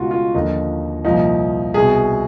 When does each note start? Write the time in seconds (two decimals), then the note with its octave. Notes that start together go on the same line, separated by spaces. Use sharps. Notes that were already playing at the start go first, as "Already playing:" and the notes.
Already playing: C#2 B2 F4 F#4
0.11 F4
0.34 D#2 D3 F3 D#4
1.04 C2 A#2 F3 D#4
1.74 C2 B2 G#4